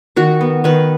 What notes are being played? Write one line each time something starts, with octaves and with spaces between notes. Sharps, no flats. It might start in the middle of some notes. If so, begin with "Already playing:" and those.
D#3 F#4
B3
D#3 B4